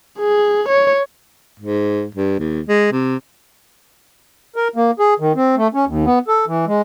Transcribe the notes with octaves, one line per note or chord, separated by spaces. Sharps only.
G#4
C#5
G#2
G2
D#2
G#3
C3
A#4
A#3
G#4
D#3
C4
A3
C#4
D#2
B3
A4
E3
G#3